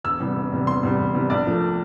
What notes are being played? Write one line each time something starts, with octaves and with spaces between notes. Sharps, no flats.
E1 E6
E2 C3 G3
E1
E2 C3 G3
E1 C6
E2 C3 G3
E1
E2 C3 G3
A#1 D5
A#2 F3 A3